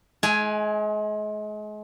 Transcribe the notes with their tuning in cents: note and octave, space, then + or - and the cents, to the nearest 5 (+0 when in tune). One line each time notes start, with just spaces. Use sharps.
G#3 +35 F5 -40 G#5 +5